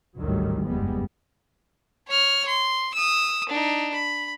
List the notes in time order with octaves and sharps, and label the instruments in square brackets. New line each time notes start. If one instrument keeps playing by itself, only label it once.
[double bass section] G#1 D2 A2 D#3 F#3 G3
F#1 E2 G2 G3 G#3 B3
[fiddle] C#5 F6
C6
D#6 E6
D4 D#4
B5